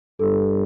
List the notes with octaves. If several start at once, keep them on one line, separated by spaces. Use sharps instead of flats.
G2 A4